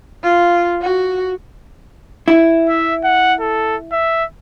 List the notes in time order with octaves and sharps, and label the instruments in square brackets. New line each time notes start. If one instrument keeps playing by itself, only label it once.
[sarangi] F4
F#4
[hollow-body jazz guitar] E4
[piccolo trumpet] E5
F#5
A4
E5